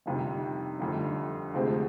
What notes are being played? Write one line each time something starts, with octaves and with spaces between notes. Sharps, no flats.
G1 F2 C3 D#3 G3
G1 F2 D3 G3
D2 C3 F3 G#3 C4